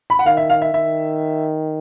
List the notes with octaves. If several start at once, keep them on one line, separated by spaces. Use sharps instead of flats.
B5
F#5
D#3 F5
E5
F5
E5
D#3 E5